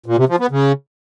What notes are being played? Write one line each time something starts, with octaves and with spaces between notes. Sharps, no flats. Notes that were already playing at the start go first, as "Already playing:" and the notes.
A#2
C3
F3
B3
C#3